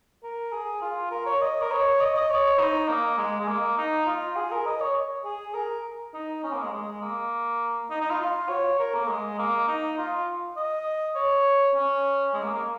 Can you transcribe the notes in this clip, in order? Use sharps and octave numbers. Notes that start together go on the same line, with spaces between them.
A#4
G#4
F4
A#4
C#5
D#5
A#4
C#5
D#5
D#5
C#5
D#4
A#3
G#3
G#3
A#3
D#4
F4
G#4
A#4
D#5
C#5
G#4
A#4
D#4
C#4
A#3
G#3
G#3
A#3
D#4
D#4
F4
F4
C#5
A#4
A#3
G#3
A#3
D#4
F4
D#5
C#5
C#4
G#3
A#3
A#3